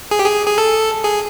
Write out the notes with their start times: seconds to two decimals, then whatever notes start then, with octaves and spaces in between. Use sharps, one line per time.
0.11 G#4
0.19 G4
0.26 G#4
0.47 G#4
0.58 A4
1.04 G#4